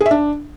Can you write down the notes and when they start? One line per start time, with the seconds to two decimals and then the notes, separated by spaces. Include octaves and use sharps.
0.01 G#4
0.06 E5
0.11 D4